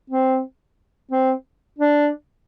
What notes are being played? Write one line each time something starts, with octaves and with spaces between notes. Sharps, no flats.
C4
C4
D4